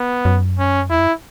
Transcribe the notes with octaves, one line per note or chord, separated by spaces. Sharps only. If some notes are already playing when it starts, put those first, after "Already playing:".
Already playing: B3
F#2
C#4
E2 E4
F#2